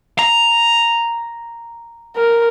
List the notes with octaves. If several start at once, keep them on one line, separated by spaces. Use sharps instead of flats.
A#5
A#4